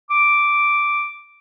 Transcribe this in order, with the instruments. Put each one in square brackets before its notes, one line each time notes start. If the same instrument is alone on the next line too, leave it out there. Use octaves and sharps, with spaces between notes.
[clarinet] D6